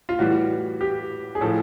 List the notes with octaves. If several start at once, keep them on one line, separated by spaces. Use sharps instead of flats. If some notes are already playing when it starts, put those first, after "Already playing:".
F4
A2 E3 G3 F#4
G4
G#4
A2 F3 A4